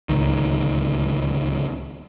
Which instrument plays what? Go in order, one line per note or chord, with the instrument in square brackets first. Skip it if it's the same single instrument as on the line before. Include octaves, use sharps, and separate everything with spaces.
[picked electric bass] D1 G#1 C#2 D#3